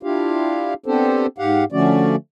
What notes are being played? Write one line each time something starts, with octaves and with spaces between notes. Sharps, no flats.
D4 E4 F4 G4 F5
B3 C4 D4 G4 A4 C5
G#2 G4 F5 F#5
D3 F3 A3 C#4 F#4 D5